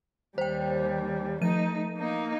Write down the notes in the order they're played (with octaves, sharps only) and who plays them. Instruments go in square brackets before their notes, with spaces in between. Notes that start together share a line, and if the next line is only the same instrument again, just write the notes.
[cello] D#2 G3 [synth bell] C5 G5
[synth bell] F3 D#7 [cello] A3 D#4
[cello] A#3 D#4